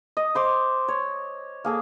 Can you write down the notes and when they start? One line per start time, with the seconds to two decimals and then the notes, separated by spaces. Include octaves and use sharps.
0.17 D#5
0.35 C5 C6 D6
0.88 C#5
1.64 A#3 G#4 A4